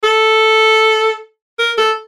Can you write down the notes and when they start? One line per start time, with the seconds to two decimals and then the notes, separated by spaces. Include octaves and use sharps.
0.04 A4
1.59 A#4
1.78 A4